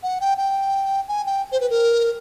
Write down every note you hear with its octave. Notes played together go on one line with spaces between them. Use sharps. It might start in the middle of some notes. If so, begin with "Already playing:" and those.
F#5
G5
G5
G#5
G5
C5
B4
A#4